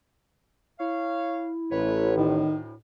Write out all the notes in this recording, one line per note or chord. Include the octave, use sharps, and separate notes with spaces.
E4 C#5 F5
A1 B4 C#5
D2 A2 D#3